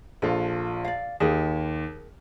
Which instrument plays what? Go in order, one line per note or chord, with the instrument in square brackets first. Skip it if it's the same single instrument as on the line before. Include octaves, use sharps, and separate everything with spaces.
[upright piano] A#1 F4 [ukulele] A4
[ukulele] D5 F5
[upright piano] D#2 [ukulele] G#4 A#4